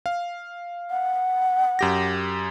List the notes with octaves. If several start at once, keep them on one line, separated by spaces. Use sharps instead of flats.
F5
F#5
F#2 G4 A#6